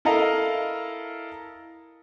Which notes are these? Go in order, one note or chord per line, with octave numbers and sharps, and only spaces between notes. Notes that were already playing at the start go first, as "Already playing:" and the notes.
E4 A4 A#4 D#5 F5